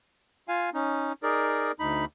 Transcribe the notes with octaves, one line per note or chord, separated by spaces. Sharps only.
F4 F5 G#5
C#4 D#4
D#4 G#4 A#4 D5
D2 D#4 B5